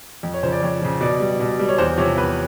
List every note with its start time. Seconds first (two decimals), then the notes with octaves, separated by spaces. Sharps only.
0.23 F2
0.34 C#5
0.43 C#3 F3 C5
0.52 D5
0.62 F2 C#5
0.82 C#3 F3
1.01 B2 D5
1.20 G3
1.40 B2
1.59 G3
1.69 C#5
1.78 E2 C5
1.98 C3 F3 C#5
2.17 E2 B4